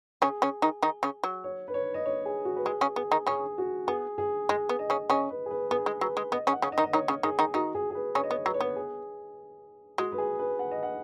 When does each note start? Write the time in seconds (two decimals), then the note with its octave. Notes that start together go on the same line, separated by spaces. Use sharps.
0.21 C#3 C#4 G#4
0.42 C#3 C#4
0.62 D#3 D#4
0.83 D#3 D#4
1.03 C#3 C#4
1.24 F#3
1.44 C#5
1.68 B4
1.74 C#5
1.94 D#5
2.06 C#5
2.26 G#4
2.45 F#4
2.56 B4
2.65 G#3 G#4
2.81 C#3 C#4
2.96 B3 G#4
3.11 D#3 D#4
3.27 C#3 C#4 G#4
3.58 F#4
3.87 B3 G#4
4.18 G#4
4.49 G#3 G#4
4.69 B3
4.79 D#5
4.90 C#3 C#4
5.10 C#3 C#4 D#5
5.30 B4
5.46 G#4
5.51 B4
5.71 B3 G#4
5.86 G#3
6.01 F#3 B4
6.17 G#3
6.32 B3 D#5
6.47 C#3 C#4
6.52 F#5
6.62 C#3 C#4
6.72 D#5
6.78 D#3 D#4
6.84 D#5
6.93 D#3 D#4 C#5
7.08 C#3 C#4
7.23 D#3 D#4 G#4
7.39 D#3 D#4
7.54 D#3 D#4 F#4
7.75 G#4
7.90 G#4
7.95 B4
8.15 C#3 C#4 C#5
8.24 D#5
8.31 B3 C#5
8.45 F#3 B4
8.54 C#5
8.61 B3 B4
8.76 G#4
9.98 G#3 F#4
10.12 B4
10.18 G#4
10.39 B4
10.59 F#5
10.71 D#5
10.83 F#5